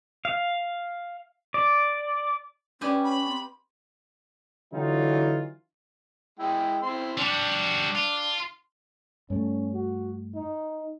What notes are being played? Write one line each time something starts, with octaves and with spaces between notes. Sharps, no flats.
F5
D5
B3 C#4 D4 G4 B4 D5 G#5
B5
C4 C6
D3 E3 F#3 D#4 F4
G#3 E4 G5
C4 E4 C6
G3 D4 F#4
F4
G2 A3 C#4
F#4
D#4